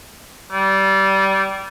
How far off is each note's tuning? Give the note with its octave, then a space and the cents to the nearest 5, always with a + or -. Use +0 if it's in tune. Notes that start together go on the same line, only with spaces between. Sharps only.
G3 -20